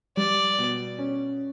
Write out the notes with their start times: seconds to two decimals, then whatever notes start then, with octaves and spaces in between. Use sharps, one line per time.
0.17 G3 D5
0.58 B2
0.99 C#4